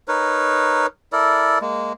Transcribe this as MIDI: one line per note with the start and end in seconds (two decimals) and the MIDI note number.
0.08 0.87 63
0.08 0.87 70
0.08 0.87 71
0.08 0.87 73
1.12 1.59 64
1.12 1.59 69
1.12 1.59 70
1.12 1.59 74
1.61 1.93 56
1.61 1.93 58